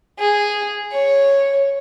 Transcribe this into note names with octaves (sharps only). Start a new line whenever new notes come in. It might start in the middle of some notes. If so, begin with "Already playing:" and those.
G#4
C#5